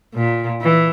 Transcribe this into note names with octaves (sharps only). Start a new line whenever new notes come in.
A#2
E3